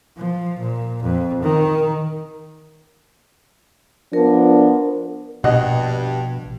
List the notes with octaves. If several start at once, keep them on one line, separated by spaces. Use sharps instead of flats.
F3
A#2
F2
D#3
F3 B3 D4 A#4
A#1 G2 B2 D#5 F#5